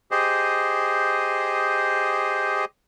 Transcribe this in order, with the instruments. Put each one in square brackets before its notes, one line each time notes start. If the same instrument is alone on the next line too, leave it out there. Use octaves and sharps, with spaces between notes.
[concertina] G4 G#4 C5 D#5